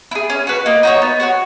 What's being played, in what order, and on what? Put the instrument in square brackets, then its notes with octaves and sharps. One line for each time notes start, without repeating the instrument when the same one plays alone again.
[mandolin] E4
G#4
C#4
F#4 B4
[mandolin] A#3 [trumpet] D#5
[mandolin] D#4 F#4 C#5
B3
F#4 C#5 F#5